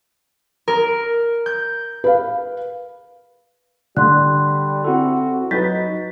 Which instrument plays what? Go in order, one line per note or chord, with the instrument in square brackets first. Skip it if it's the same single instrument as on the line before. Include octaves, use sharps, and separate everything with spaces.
[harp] A#4
G6
[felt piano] B4 F5
[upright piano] D3 [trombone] G3 [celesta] C6 F#6
[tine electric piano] C4 E4 A4 [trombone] F#4
[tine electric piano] F#3 F#4 A6 [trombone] D#4 [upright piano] B4 G6 [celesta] B6